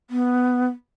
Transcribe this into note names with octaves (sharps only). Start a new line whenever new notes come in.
B3